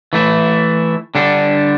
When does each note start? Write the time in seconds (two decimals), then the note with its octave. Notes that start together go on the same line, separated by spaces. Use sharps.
0.13 E3 A3 E4
1.15 D3 G3 D4 A4